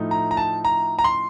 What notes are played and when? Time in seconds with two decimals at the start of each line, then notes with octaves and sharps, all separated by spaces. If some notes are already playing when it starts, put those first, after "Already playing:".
Already playing: A2 F3 A3 D#4
0.11 A#5
0.31 A#5
0.37 A5
0.65 A#5
0.99 A#5
1.04 C6